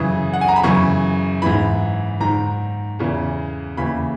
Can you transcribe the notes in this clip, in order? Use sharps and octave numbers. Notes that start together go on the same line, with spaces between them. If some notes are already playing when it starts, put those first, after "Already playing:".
Already playing: F#2 C#3 E3 D#6
F#5
G#5
A#5
B5
F#2 C#3 E3 C#6
G#2 E3 B5
G#2 D#3 A#5
E2 C#3 E3
D#2 C#3 E3 B5